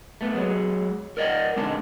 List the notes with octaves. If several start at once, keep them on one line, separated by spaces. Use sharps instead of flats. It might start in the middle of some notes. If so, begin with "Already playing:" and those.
A3 B3
F#3 G#3
A#4 D5 D#5 F#5
D3 G#3 C4 D4